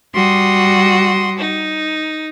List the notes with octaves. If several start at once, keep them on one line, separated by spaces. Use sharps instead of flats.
G3 F#4 C6 D#6
D#4